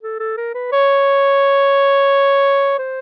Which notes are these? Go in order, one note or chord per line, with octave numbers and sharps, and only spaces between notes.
A4
A4
A#4
B4
C#5
C5